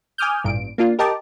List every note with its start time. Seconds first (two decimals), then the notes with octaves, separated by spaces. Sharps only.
0.18 G#5 D6 D#6 F6 G6
0.44 A1 G2 A#2 D7
0.78 A#3 D4 F4
0.99 G4 A#4 D#5 G5 A5 D6